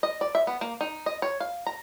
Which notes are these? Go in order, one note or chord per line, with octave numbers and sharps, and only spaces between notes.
D#5
D5
E5
B3
A#3
D#4
D#5
C#5
F5
A#5